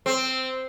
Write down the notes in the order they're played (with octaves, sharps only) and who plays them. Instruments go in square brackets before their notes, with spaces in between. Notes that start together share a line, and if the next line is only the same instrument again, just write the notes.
[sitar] C4